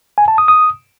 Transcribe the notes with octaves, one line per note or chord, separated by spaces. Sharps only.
G#5
A5
D#6
D#6